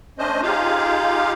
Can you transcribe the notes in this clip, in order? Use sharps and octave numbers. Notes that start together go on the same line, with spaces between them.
A3 C#4 D4 C5 D#5
D#4 F4 G4 G#4 F5